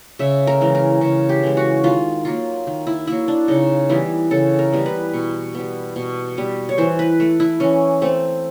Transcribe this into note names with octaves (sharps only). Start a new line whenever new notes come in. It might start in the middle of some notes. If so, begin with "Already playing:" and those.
C#3 E5
A#4
E3 G#3
A#4
C#3
G4
E3 G#3
F#4
D#3 F4
F#3 A#3 F4
D#3
E4
F#3 A#3 E4
D4
C#3 D#4
E3 G3 B3 E4
C#3 A4
A#4
E3 G3 B3
B4
B2
G3 B3
B2
G3 B3
C#5
E3 C5
B4
A3
E4
E3 C#4
A3 C4